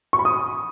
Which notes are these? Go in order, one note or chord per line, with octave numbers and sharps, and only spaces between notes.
C#6
B5
D#6